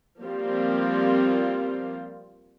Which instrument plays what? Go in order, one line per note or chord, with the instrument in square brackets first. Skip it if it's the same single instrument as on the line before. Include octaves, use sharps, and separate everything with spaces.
[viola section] F3 G3 A#3 C4 F4